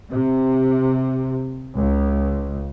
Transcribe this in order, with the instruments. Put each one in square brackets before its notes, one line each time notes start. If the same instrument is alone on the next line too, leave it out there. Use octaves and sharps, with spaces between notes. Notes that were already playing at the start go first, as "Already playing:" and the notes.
[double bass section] C3
C#2